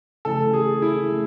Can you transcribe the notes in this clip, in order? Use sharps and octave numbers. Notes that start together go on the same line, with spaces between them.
C#3 E3 A3 A4
G#4
E4
A3